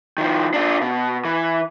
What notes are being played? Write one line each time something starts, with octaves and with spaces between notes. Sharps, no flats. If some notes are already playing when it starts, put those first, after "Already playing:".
D#3 F3
D4 F4
B2
E3